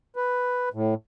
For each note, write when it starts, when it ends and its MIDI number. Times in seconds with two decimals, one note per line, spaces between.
0.16 0.69 71
0.74 0.94 45